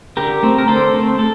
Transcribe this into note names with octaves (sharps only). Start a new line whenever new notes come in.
D3 G4 A#4
A3 C4
A#4
D3 A4 C5
A3 C4
A4